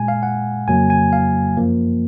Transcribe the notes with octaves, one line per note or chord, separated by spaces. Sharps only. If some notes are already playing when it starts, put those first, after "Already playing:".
Already playing: A#2 G#3 G#5
F5
F#5
F2 C#3 F#3 A#3 G#5
G#5
F5
F#2 F3 A#3